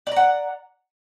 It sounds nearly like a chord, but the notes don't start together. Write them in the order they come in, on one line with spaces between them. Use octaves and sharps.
D5 A#5 F#5